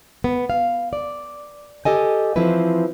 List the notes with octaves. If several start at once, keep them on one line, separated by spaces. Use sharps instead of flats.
B3
F5
D5
G4 A4 D#5 G#5
E3 F3 C4 E4 B4